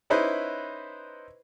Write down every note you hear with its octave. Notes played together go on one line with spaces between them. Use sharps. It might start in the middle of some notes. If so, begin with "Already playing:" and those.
C#4 D#4 E4 B4 C5